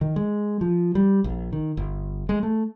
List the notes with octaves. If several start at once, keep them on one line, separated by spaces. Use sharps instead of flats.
D#3
G#3
F3
G3
A#1
D#3
G1
G#3
A3